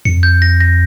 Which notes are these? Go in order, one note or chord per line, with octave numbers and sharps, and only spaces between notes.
F2 C#7
G6
A#6
A#6